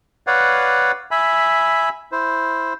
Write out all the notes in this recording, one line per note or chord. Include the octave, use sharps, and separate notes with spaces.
B4 C#5 D5 F5 F#5
E5 G#5 B5
E4 C5